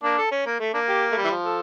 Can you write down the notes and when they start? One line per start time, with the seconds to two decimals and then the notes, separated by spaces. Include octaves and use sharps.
0.03 A#3 D4
0.18 A4
0.32 C#4
0.46 A#3
0.60 A3
0.74 A#3 D4
0.89 G4
1.12 A3
1.17 G3
1.24 E3
1.31 F3
1.45 A4